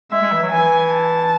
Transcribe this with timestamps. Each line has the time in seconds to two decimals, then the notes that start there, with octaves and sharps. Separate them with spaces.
0.12 G#3 E5
0.22 G#3
0.32 E3
0.42 F#3
0.52 E3 G#5
0.93 A5